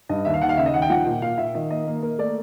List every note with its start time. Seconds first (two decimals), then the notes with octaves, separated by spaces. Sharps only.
0.09 G2 D#5
0.25 D#2 E5
0.34 F5
0.42 D#2 F#5
0.49 F5
0.57 C#3 E5
0.66 D#5
0.74 D#2 F#5
0.82 G5
0.90 F3 F#5
1.06 A#2
1.22 A#2 F5
1.38 A#2 E5
1.55 D#3 D#5
1.70 A#3 D#5
1.87 A#3
2.02 A#3 A#4
2.19 A3 D5